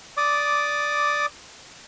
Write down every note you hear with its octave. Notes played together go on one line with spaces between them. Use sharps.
D5 D6 D#6